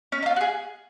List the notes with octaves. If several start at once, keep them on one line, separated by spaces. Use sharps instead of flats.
C#4
D#4
F4
F#4
G#4